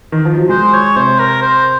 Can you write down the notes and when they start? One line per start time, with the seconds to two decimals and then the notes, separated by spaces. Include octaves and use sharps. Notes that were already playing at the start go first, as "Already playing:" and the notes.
0.12 D#3
0.25 F3
0.37 F#3
0.49 G#3 C5
0.73 C#5
0.96 C3 C5
1.19 A#4
1.42 C5